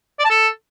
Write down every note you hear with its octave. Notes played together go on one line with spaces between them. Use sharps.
D5
A5
A4